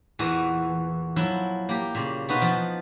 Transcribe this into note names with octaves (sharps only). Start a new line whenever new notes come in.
E2 A#2 E3 F#4
F3 F#3 E4
A#3 G4
A#2 C#3
B2 B3 D#4 F4 F#4 B4
F3